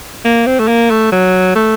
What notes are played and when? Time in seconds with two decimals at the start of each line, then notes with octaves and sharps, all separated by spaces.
0.25 A#3
0.46 C4
0.59 A3
0.68 A#3
0.90 A3
1.12 F#3
1.55 A3